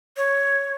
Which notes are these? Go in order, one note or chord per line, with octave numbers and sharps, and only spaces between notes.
C#5